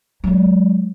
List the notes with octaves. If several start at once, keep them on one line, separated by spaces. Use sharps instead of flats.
F#3 G#3